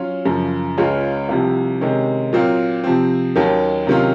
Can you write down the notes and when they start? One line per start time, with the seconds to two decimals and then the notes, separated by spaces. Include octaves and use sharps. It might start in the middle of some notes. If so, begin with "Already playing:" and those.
Already playing: F#3 C#4 F4
0.25 F#2 C#3 F3
0.77 C#2 C#3 G#3 C#4 F4
1.29 C2 C3 F3
1.81 C3 D#3 G#3 C#4
2.33 A#2 F#3 C4 F4
2.84 C3 F3 C4
3.35 D#2 D#3 F#3 C#4
3.87 C3 D#3 F#3 C#4 F4